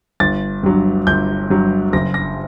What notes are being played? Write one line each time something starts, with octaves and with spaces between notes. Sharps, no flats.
G1 A6
G2 F#3
G1 G6
G2 F#3
F#1 A#6
A#6